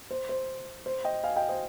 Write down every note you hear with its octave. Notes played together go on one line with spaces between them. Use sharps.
C5
C5
C5
D#5 G5
F5 G#5
D#5 G5
C5 D#5